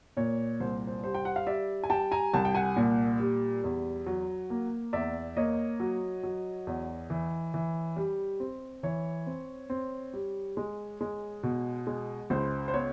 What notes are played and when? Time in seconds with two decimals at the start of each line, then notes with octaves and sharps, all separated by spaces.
0.17 A#2 C#5
0.60 C2 C5
0.87 C5
1.04 G3 C5
1.14 G5
1.25 F#5
1.36 F5
1.47 G3 D5 E5
1.84 G#5
1.90 G3 G5 A5
2.11 G#5 A#5
2.33 C2 G5 A5
2.45 G5
2.55 F#5 G#5
2.76 A#2
3.20 G3
3.64 E2
4.06 F#3
4.50 A#3
4.93 E2 D5 E5
5.36 A#3 C#5 D#5
5.80 F#3
6.23 F#3
6.67 E2
7.10 E3
7.54 E3
7.96 G3
8.40 C4
8.83 E3 C#5
9.27 C4
9.70 C4
10.13 G3
10.57 G#3
11.01 G#3
11.43 B2
11.87 G#3
12.30 C#2 C5
12.68 C5
12.73 B3 C#5